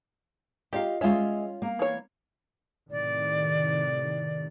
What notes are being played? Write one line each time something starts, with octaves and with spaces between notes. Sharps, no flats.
F4 G4 D#5 F5
G#3 C#4 F4 E5
A#3
E3 C#5
A2 C3 D#3 D5